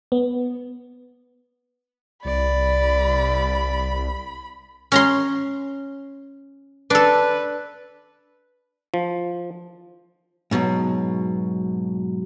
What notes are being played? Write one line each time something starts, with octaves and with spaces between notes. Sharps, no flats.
B3
C2 D5 B5
C#4 A#5 C6
D4 A4 B4
F3
G#2 B2 E3 F#3